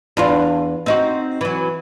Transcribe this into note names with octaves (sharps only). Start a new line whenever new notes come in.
E2 D4 F4
C4 D#4 F#4
E3 F#3